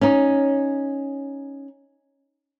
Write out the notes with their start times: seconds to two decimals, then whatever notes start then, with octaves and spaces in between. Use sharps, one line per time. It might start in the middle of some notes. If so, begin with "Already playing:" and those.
0.01 C#4 D#4